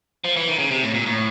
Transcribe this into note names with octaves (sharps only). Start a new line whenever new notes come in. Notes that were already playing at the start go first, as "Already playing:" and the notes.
F3
E3
D#3
C#3
C3
A2
A#2
A2